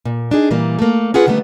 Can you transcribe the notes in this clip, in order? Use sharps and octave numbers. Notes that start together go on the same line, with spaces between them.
A#2
D4 D#4 G#4
A#2 E3 G3 A#3
A3 A#3
C#4 F4 G#4 B4 F#5
D3 D#3 G3 A3 B3